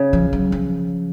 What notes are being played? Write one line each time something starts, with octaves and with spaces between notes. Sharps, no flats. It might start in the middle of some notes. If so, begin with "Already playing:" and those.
Already playing: C#3
F3
F#3
F3